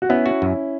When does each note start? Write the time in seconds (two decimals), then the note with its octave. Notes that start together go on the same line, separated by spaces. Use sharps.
0.02 F#4
0.09 B3 C#4 E4
0.26 F#4
0.42 F#2